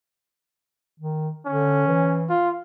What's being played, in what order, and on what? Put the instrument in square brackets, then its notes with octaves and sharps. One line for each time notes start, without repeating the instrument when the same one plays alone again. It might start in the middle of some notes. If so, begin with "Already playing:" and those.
[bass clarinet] D#3
[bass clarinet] D3 [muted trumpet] C#4
[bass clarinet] E3
[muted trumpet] F4